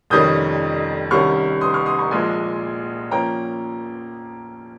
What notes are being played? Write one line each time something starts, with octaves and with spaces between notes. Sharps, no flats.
F1 F2 D#3 G3 C#4 D#6 G6
C2 C3 D#3 G3 C#4 C#6 F6
C6 D#6
C#6 F6
C6 D#6
A#5 C#6
A#1 A#2 F3 G#3 G#5 C6
F3 A#3 C#4 G5 A#5